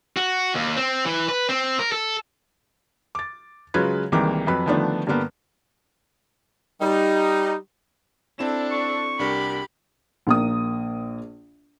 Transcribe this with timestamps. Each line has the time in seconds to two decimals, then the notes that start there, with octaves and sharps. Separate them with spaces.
0.17 F#4
0.54 D#2
0.76 C4
1.05 E3
1.28 B4
1.49 C4
1.79 A#4
1.92 A4
3.15 D6 A6
3.74 C#3 F#3 G#3 F4 B4 G#6
4.12 C2 D#3 E3 G#3 A#3 D6
4.47 F2 F#3 B4 B5
4.66 D3 D#3 F3 A3 B3 D4
5.07 G2 D3 G3 A#3 B3
6.81 G3 D#4
8.39 C4 D4 E4 A4 E7
8.72 C#6
9.19 C2 D4 G4 A#4 B5
10.27 A#1 A#3 D#6